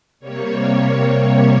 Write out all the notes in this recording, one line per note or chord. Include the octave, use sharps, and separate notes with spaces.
C3 G3 A#3 C#5